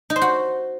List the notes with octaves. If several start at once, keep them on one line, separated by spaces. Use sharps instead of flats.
D#4
C5
F#4